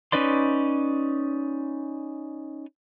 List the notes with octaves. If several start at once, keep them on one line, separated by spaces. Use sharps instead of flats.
C#4 D#4 B4 D5 C6